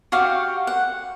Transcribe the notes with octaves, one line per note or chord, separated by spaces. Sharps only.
F#4 G4 F5 C#6
F#5